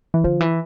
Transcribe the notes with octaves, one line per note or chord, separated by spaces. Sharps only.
E3
D3 F3
E3